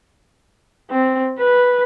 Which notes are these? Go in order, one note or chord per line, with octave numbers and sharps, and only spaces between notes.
C4
B4